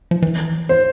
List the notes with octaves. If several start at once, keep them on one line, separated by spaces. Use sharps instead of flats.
F3
E3
C5